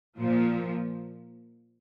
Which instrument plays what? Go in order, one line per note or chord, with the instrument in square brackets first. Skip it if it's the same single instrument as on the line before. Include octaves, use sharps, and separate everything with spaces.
[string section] A#2 F3